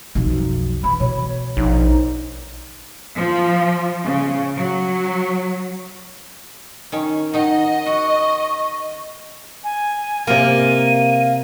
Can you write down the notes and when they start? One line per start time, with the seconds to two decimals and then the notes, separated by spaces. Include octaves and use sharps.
0.15 B1 F2
0.84 E3 B5
1.00 B2 C#5
1.57 A#1 D#4
3.17 F3
4.04 C#3
4.57 F#3
6.92 D#3 C#4
7.34 D#3 D#4 D#5 F#5
7.86 F#4 C#6
9.64 G#5
10.27 C3 A#3 A#4 D#7